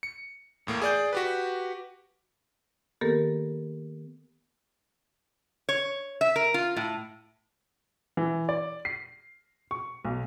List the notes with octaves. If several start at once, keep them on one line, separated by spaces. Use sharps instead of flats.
C#7
E2 A2 A#3
G#4 D5 G6
F#4 G4 B4
D#3 A#3 B3 G4 A4 A#4
C#5
E5
A#4
F4
A2
E3
D5
C7
C#6
B1